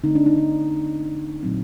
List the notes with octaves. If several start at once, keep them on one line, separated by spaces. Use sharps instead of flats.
D3 A3 C4 D#4
D4
D#4
D4
A#2 F#3 A3 C4